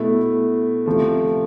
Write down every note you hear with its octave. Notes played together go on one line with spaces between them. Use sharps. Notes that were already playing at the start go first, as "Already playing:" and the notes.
Already playing: B2 A3 E4
C3 F3 A3